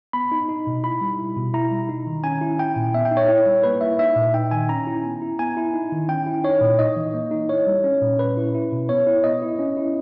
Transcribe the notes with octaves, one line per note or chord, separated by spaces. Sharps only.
B3 B5
D#4
D#4
B2
E4 B5
G3
E4
B2
E4 A#5
G3
D#4
D#3
C#4 G#5
E4
E4 G5
A#2
B3 E5
G5
D#4
C#5
E4
G3
A#3 B4
E4 E5
D#4 E5
A#2
D#4 G5
D#3 G#5
C#4 A#5
E4
B3
E4
B3 G#5
E4
D#4
D#3
C#4 G5
E4
D#4 C#5
A#2
D#4 D#5
E3
A#3
D#4
E4 C#5
G3
C#4
A#2
C#4 B4
E4
E4
B2
B3 C#5
E4
B3 D#5
E4
C#4
E4